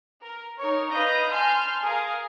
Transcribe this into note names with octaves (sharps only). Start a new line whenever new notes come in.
A#4
D#4 A#4 C#5
B4 D#5 F5 D#6 G6 A#6
G#5 A5 C6 F6 G6
G#4 A#4 F5